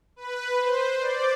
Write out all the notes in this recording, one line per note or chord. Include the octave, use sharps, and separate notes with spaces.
B4
C5
D5